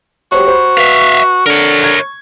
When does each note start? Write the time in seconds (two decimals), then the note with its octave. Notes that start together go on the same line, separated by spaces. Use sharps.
0.32 F#4 G4 C5 C#5
0.48 C5 B5
0.77 B4 E5 F5
1.46 D3 A#4 C#5
1.81 C#6 G#6